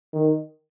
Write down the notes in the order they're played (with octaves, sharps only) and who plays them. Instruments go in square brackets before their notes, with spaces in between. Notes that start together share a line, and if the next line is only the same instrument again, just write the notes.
[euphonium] D#3